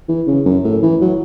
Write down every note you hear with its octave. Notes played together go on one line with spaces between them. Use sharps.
E3
C#3
F#2
A2
E3
F#3